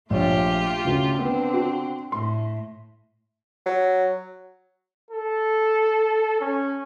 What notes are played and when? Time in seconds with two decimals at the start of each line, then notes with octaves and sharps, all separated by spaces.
0.10 A#1 A3 F4 G4 C#5
0.85 D2 C#3
1.19 D3 B3 C4
1.54 F#4
2.12 A2 C6
3.66 F#3
5.11 A4
6.41 C#4